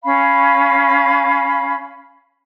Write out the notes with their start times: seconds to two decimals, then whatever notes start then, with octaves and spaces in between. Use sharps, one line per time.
0.04 C#4 F5 B5